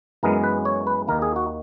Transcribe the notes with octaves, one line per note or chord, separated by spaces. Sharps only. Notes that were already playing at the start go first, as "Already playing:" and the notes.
F#2 E3 G#3 B3 A#4
B4
C#5
B4
D#2 D#3 A#3 A#4
G#4
F#4